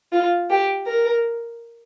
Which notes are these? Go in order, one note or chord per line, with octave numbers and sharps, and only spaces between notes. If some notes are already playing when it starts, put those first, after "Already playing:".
F4
G4
A#4